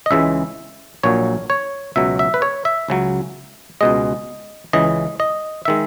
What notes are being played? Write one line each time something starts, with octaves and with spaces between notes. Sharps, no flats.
D#5
C#2 C#3 E3 G#3 E5
A#1 A#2 F#3 C#5
C#5
C#2 B2 F#3 E5
E5
B4
C#5
E5
C#2 C#3 F#3
C#2 B2 G#3 D#5
C#2 C#3 E3 D#5
D#5
D#3 G#3 E5